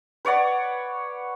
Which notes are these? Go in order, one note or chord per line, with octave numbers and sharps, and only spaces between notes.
B4 C#5 D5 F#5